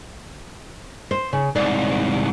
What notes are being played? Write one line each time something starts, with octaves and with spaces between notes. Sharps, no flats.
C5
C#3
C2 G#2 D5